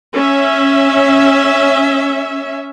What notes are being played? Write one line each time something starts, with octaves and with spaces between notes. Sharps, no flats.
C#4 E5